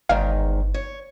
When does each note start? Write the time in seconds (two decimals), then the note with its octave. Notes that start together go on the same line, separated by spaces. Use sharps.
0.09 G1 E2 G#2 D#3 F5
0.74 C#5